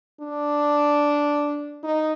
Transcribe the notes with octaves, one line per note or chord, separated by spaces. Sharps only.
D4
D#4